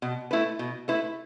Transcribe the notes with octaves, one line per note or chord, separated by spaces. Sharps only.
B2
A3 E4 B4
B2
A3 E4 B4